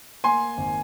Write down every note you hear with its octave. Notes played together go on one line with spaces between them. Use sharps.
A#3 G#5 C6
G#1